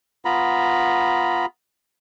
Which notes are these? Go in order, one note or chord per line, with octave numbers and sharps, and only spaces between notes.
B3 F4 A#5 B5